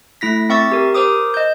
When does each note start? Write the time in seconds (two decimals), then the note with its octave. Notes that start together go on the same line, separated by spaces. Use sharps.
0.21 A3 E4 A#6 B6
0.49 C4 E5 C#6 E6 A6
0.72 G4 A#4
0.94 A#4 C5 D6 D#6
1.34 D#5 G6